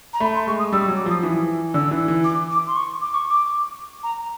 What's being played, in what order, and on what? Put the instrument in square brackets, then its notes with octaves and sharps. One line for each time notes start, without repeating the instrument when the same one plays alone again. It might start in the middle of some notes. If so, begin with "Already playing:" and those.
[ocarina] A#5
[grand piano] A3 [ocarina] B5
[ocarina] C6
[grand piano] G#3 [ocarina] C#6
[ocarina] D#6
[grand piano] G3 [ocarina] E6
[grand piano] F#3
[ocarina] D6
[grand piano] F3 [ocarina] D#6
[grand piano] E3
[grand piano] D3 [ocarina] E6
[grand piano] E3
E3
[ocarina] D6
D6
C6
C#6
D6
C#6
D6
A#5